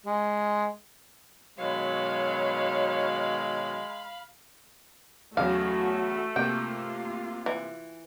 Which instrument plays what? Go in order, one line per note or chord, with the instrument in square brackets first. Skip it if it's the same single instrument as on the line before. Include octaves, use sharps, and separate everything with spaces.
[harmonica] G#3
[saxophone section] B2 D#3 F#3 [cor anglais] G#3 [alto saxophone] C#5 [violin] F5 B5
[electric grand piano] E2 C#3 F#3 [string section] A3 [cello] F#4 [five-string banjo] F5
[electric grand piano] C3 A#3 [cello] F4 [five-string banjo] G5
[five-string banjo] E3